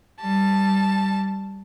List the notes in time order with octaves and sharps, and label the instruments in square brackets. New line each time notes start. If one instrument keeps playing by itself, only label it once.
[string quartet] G3 A5